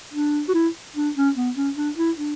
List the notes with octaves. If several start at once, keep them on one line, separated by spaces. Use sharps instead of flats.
D4
F#4
E4
D4
C#4
B3
C#4
D4
E4
D4